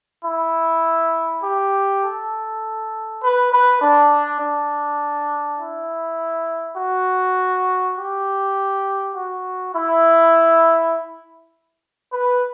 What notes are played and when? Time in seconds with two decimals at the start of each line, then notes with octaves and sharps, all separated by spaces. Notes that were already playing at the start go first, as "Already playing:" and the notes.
0.25 E4
1.43 G4
2.03 A4
3.21 B4
3.52 B4
3.81 D4
4.40 D4
5.59 E4
6.77 F#4
7.97 G4
9.15 F#4
9.75 E4
12.13 B4